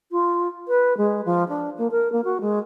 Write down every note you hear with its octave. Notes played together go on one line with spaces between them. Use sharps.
F4
B4
G#3
F3
D4
A#3
A#4
A#3
F#4
G#3